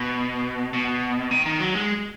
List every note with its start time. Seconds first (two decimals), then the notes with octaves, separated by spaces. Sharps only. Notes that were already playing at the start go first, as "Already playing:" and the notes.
Already playing: B2
0.73 B2
1.31 D#3
1.46 D#3
1.60 F#3
1.75 G#3